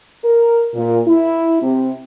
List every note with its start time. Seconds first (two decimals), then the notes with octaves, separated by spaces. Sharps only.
0.25 A#4
0.74 A#2
1.08 E4
1.62 C3